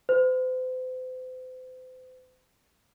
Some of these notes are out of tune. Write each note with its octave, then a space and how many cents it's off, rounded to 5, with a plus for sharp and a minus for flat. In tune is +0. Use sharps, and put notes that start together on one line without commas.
C5 -40